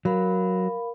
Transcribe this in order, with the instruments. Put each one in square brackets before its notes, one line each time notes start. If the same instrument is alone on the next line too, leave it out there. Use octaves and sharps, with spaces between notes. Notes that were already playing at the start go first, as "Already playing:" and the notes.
[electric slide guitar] F#3 [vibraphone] A#4 F5 B5